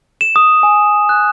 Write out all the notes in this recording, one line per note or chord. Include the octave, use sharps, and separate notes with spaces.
E7
D#6
G#5
F#6